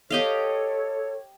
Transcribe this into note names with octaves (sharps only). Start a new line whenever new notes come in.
G4 A4 C#5 D#5 F5